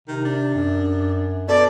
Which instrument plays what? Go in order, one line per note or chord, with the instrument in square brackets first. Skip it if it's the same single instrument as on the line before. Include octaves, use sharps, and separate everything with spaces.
[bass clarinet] C3 [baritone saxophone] D#3
[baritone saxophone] D4
[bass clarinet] F#2
[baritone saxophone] B2 [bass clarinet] A4 [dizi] D5